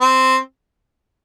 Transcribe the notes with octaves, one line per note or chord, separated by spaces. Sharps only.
C4